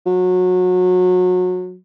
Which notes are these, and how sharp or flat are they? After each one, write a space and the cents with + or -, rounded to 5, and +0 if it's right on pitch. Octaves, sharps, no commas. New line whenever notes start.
F#3 -25